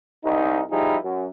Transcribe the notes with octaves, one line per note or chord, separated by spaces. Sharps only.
C2 D#4
F3 G3 D#4 E4 G#4
F#2